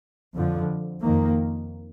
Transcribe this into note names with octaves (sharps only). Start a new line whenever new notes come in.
F2 D3 F3
F2 D#3 A#3